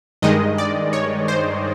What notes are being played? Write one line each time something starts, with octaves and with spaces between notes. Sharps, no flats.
G2 D#3 G#3 D#5
D5
C#5
C5